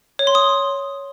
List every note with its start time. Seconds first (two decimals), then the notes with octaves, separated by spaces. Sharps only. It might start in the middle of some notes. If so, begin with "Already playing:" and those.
0.19 C#5
0.27 C6
0.35 D#6